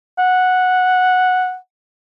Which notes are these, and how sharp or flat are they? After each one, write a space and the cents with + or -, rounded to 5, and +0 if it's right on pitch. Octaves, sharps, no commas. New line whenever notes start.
F#5 -5